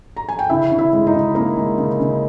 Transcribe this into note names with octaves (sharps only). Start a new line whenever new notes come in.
A#5
G#5
G5
C#3 E4 E5
C#3
E4 E5
G#3
D#4 D#5
C#3
A#3 D#4 A#4
G#3
C#3
C#3